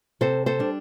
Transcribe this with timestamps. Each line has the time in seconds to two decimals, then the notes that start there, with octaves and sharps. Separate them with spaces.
0.21 C3 A4 C5
0.46 A4 C5
0.59 G3 D4